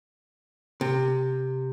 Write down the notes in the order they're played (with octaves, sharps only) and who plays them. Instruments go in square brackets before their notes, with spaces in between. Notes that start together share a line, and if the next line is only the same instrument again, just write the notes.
[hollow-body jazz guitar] C3